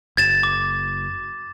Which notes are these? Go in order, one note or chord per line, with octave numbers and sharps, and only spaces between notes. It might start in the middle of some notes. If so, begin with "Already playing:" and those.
F#1 G#6 A6 E7
D6